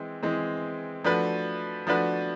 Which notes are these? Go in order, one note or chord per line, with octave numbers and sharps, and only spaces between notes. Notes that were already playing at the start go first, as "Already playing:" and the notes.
Already playing: E3 G#3 C4
E3 G#3 C4
F3 A3 D4 F#4 B4
F3 A3 D4 F#4 B4